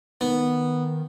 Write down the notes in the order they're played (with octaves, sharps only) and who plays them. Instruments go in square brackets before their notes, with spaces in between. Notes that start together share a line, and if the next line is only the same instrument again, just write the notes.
[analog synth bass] D#3 [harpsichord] B3